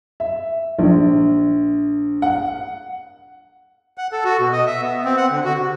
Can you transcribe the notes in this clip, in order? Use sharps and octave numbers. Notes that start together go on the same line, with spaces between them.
E5
A#1
F#5
F#5
A4
F#4
B2
D#5
E5
B3
C4
F#5
D3
F#4
C3